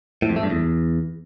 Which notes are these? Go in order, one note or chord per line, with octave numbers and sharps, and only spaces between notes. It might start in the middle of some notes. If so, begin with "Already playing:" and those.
A2
F2
A3
G2
E2